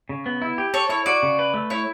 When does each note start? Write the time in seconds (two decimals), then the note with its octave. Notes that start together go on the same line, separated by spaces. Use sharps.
0.09 C#3
0.26 B3
0.42 E4
0.58 G4
0.74 A4 C#5
0.89 E4 C#5
1.06 F#4 D5
1.23 C#3
1.39 B4
1.54 A3
1.70 E4 C#5